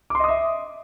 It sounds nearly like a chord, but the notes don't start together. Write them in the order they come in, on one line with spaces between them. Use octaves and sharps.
D6 C6 D#5 D#6 E5